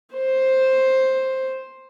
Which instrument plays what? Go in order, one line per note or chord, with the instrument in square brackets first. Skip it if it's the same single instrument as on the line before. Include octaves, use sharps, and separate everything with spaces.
[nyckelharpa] C5